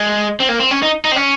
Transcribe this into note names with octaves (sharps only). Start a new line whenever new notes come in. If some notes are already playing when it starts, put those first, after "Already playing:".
Already playing: G#3
C4
A#3
C4
C#4
D#4
D#4
C4
C#4